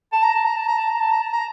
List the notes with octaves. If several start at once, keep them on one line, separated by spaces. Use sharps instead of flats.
A5
A#5
A5
A#5
A5
A#5
A5
A#5
A5
A#5
A5
A#5